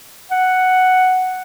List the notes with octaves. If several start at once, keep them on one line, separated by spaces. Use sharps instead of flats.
F#5